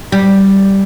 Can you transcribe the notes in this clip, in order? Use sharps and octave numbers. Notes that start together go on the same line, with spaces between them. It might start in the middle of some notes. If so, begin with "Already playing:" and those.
G3